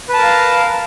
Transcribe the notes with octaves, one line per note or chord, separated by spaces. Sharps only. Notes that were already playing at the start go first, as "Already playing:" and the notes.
A#4 B4 F5 A5